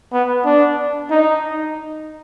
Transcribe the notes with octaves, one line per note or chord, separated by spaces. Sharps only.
B3
D4
D#4